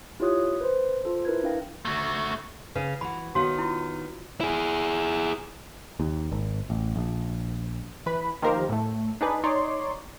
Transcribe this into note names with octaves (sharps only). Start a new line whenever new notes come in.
E4 F4 G4 C#5 D#6 F#6
B4 C5
F4 A4 C5
E4 A#4 B4 G#6
D4 E4 F5 G5 A#6
A3 F#4
C#3 C#4 B4
E3 F#4 B5
D#3 B3 F#4 C#5 F5
E4 F4
E4 G#4
D#2
G#1
A1
A#1
E3 B4 B5
D#3 F3 A#3 G4 A#4 C5
A2 A3
D4 D#4 G#4 B4
D#4 C#5 D5 C6